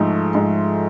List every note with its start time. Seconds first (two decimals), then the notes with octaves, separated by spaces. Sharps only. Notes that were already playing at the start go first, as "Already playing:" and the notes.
Already playing: G#2 F3 A3
0.35 G#2